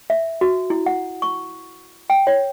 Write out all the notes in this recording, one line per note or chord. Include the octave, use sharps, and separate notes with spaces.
E5
F#4
E4
F#5
C#6
G5
C#5